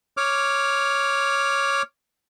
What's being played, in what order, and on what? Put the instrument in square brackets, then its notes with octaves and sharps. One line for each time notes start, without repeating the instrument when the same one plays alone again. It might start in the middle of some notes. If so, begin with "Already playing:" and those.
[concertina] C#5 D6 F6